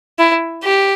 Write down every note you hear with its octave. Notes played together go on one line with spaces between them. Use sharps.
E4
G4